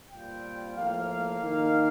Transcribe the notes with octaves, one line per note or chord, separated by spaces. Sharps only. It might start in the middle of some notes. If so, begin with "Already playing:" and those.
A#2 G3 C4 F4 G5
A2 F3 A#3 F5
D#3 A#3 D#4